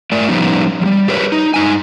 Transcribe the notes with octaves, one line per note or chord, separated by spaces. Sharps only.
A3 A#4 D5
F3 G3 B3 C#4 D#4
F3 G3
G4 A#4 B4 C#5
D#4
G2 D#4 G#5